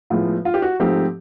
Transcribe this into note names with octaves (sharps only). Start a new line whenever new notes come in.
A2 F3 G#3 B3 F4
F4
G4
F#4
G#2 F3 A3 C4 G4